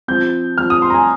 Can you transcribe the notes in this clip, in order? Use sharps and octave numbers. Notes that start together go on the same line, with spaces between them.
F3 C4 G6
F3 C4 F6
D#6
C6
A#5
G#5